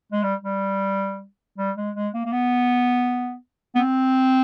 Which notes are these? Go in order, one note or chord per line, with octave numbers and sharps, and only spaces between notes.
G#3
G3
G3
G3
G#3
G#3
A#3
A#3
B3
B3
C4